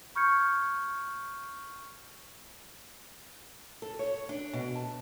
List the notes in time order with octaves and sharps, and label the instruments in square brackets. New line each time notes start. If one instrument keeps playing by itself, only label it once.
[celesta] B5 C#6 F6 G6 G#6 C#7
[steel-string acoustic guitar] A4
C#5
D4
B2
A5